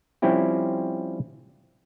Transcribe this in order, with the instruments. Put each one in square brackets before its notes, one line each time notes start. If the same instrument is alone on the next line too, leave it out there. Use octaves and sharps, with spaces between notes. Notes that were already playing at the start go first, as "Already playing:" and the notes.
[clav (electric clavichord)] F3 G3 C4 C#4 E4 G4